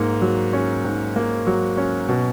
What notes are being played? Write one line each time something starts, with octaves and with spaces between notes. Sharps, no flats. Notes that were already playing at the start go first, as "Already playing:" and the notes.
Already playing: G#2 A#3
F#3
C#4
G#2
A#3
F#3
C#4
B2